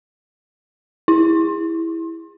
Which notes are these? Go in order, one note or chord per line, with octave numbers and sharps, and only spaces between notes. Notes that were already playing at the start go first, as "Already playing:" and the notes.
E4